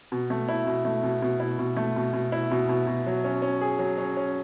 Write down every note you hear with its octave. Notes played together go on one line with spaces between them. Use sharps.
B2
A3
E4
B2
A3
B2
B2
E4
B2
A3
B2
B2
E4
B2
B2
B2
F#3
C#4
C#4
G#4
F#3
C#4
C#4